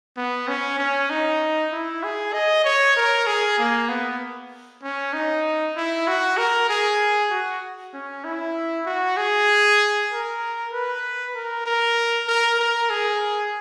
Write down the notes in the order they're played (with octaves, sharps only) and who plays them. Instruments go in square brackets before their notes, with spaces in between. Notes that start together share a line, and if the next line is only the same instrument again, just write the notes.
[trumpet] B3
C#4
C#4
D#4
E4
G#4
D#5
C#5
A#4
G#4
A#3
B3
C#4
D#4
E4
F#4
A#4
G#4
F#4
C#4
E4
F#4
G#4
A#4
B4
A#4
A#4
A#4
A#4
G#4